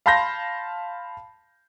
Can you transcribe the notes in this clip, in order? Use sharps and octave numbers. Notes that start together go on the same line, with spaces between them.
F5 A5 B5 C6 G6 A#6